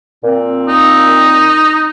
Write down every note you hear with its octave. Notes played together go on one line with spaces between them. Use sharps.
A#2 C4
D#4